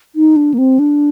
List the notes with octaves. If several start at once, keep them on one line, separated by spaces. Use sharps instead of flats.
D#4
D4
A#3
C4
D4